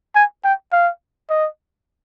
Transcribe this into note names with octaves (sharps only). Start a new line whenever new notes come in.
G#5
G5
F5
D#5